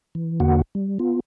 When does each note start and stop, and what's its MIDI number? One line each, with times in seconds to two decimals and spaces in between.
0.15 0.40 52
0.40 0.62 40
0.40 0.62 50
0.40 0.62 58
0.40 0.62 66
0.40 0.62 78
0.75 0.98 55
0.99 1.20 59
0.99 1.20 65